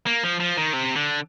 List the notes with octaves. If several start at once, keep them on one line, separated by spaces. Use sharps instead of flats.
A#3
F3
F3
D#3
C3
D3